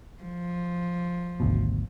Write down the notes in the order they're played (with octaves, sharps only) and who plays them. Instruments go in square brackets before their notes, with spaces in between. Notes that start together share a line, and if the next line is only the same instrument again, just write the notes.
[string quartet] F3
[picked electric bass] G#1 D2 B2